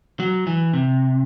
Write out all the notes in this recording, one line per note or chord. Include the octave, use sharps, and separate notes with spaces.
F#3
E3
C3